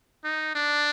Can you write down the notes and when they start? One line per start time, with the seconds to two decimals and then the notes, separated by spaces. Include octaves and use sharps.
0.24 D#4
0.55 D4